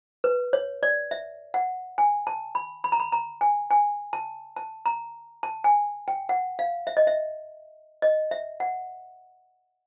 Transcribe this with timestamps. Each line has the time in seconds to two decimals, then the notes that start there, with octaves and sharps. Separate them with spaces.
0.24 B4
0.53 C#5
0.83 D5
1.11 E5
1.54 F#5
1.98 G#5
2.27 A5
2.55 B5
2.84 B5
2.92 A#5
3.00 B5
3.12 A#5
3.41 G#5
3.71 G#5
4.13 A5
4.57 A5
4.86 A#5
5.43 A5
5.64 G#5
6.08 G5
6.29 F#5
6.59 F5
6.87 E5
6.97 D#5
7.07 E5
8.02 D#5
8.31 E5
8.60 F#5